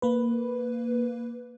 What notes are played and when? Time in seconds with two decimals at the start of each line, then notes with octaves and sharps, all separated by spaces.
0.02 A#3 B4